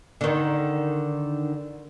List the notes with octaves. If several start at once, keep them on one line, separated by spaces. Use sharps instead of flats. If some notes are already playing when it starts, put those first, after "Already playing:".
D3 D#3